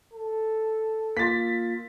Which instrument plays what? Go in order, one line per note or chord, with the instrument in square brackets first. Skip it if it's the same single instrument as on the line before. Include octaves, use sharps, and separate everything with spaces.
[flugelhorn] A4
[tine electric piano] A#3 F4 [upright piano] A6 B6